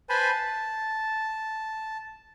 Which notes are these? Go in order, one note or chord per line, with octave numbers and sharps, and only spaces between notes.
B4 C5 G#5 A5 B5 C6
A5